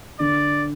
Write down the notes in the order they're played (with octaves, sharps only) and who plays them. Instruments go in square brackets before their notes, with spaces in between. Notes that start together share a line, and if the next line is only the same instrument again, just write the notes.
[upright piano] D3 [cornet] D5